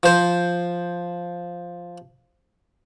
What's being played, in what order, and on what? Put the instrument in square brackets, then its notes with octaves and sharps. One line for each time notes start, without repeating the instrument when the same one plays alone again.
[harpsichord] F3 C5